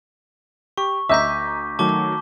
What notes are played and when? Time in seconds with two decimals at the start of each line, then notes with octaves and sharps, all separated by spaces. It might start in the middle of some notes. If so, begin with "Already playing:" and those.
0.77 G4 C#6
1.09 D2 D#5 E5 A#5 D6 G6 B6
1.79 D#3 F#3 A3 A5 D6 G7